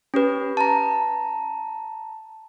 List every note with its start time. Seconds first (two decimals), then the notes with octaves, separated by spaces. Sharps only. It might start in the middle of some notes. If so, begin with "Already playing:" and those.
0.14 C#4 G4 B4
0.57 A5 A#5